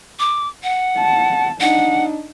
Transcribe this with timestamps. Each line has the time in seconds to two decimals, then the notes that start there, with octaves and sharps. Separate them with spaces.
0.20 D6
0.63 F#5
0.98 A5
1.61 D4 D#4 F#5